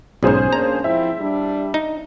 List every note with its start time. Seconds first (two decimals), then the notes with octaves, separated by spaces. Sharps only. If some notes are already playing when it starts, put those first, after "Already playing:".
0.23 B1 G#2 C#4 G#4 C5
0.53 A#3 D4 A#5
0.84 F3 C4 E4 E5
1.20 G3 D4
1.74 D#4